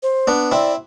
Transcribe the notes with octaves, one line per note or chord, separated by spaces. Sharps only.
C5
B3 D4
C4 E4 D5